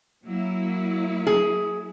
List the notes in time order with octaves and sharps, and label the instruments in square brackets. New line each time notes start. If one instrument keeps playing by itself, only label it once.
[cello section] F#3 A#3 E4
[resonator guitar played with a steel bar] G#4